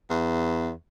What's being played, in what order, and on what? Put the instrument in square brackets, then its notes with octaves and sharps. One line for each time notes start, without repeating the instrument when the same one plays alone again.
[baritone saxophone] E2